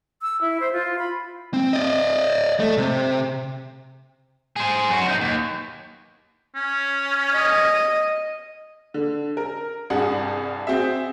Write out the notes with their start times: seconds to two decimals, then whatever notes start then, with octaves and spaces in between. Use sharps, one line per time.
0.22 E6
0.41 E4
0.60 C5
0.73 F4
0.99 B5
1.54 C4
1.73 D5 D#5
2.60 A3
2.77 C3
4.56 G#4 C5
4.89 F#2 F#4
5.07 B2 D#4
5.21 D#2
6.55 C#4
7.35 D#5
8.94 D3
9.37 A#4
9.90 C2 G2 G#4 F#5
10.67 C4 F#4 G#4 E5